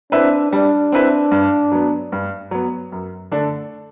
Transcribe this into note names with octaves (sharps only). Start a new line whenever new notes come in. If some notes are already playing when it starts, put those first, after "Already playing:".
C4 D4 E4 B4 E5
G3 D4
C4 E4 B4 E5
G2
F#3 B3
G2
F#3 B3
F#2
D3 A3 D4 A4